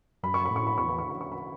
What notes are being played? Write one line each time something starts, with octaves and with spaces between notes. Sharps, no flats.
F#2 B5
C#6
B5
A2
C#6
B5
E2 C#6
B5
C#6
B5
C#6
B5